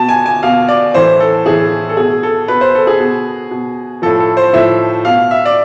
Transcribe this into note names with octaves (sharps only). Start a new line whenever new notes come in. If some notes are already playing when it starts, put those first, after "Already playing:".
Already playing: B2 A5
G#5
G#5
B2 F5
D5
A2 E3 C5
A4
A2 E3 G#4
A4
B2 G#4
A4
B2 B4
C5
A4
G#4
B2
B2
A2 F3 A4
A4
C5
A2 F3 E5
B2 F5
E5
D5